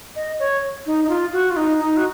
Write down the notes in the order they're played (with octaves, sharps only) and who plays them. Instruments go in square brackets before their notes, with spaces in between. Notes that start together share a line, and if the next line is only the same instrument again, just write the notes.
[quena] D#5
C#5
D#4
D#4
F4
F#4
F4
D#4
D#4
F#4